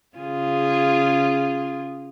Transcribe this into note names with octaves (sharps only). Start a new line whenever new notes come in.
C#3 F4 G#4